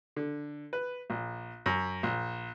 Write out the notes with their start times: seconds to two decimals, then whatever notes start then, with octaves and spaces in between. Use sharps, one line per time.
0.16 D3
0.73 B4
1.10 A#1
1.66 F#2
2.03 A#1